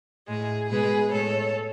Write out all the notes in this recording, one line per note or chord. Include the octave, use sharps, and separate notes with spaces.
A2 G#3 G#4
B2 G#3 G#4 B4
A2 G#3 A4 C#5